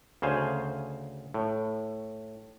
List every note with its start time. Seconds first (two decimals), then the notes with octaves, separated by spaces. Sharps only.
0.22 D2 C#3 C5 F5 G#5
1.34 A2